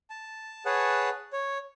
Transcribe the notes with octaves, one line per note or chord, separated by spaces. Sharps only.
A5
G#4 B4 C#5 F#5 A5
C#5